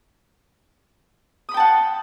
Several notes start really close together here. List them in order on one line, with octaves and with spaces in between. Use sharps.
D#6 B5 G5 A5 F#5